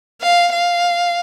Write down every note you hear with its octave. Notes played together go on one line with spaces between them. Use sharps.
F5
F5